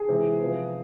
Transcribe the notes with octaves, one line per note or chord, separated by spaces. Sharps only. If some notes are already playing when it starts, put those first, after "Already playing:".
Already playing: G#4
C3 E3 G#3 C4
C3 F3 B3